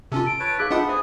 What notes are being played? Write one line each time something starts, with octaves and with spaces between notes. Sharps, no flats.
C3 C#4 F4 A4
D7
B4 C#5 A5
D#4 G#4 E5 F5 F#6
A3 B3 D4 F4 B4 D#5 F#5 B5
G#4 A4 C5 E5 G#5